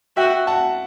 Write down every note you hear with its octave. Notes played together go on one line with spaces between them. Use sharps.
F#4 E5 G5
F#5 A5